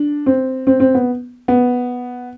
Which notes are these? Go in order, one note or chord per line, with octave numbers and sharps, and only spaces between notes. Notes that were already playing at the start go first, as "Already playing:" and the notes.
Already playing: D4
C4
C4
C4
B3
B3